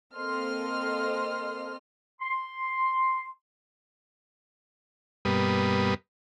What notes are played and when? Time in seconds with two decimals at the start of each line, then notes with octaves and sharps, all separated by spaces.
0.16 A#3 C4 A4 D#5 C6 F6
2.22 C6
5.25 G2 B2 G3 A#3 B4 D#6